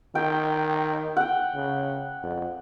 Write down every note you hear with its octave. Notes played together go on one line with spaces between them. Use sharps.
D#3 G5
F#5 G5
C#3
F2